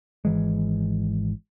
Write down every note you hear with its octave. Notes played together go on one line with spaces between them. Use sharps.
G#1 E3 G#3